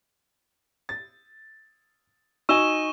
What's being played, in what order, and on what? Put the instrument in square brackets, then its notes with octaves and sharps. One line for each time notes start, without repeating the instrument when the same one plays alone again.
[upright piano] A6
[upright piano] D#4 D#5 G#5 [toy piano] F#4 E6 [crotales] C#6 E7 G7